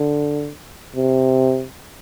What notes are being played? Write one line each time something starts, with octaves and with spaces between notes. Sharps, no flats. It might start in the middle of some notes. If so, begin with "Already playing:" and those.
Already playing: D3
C3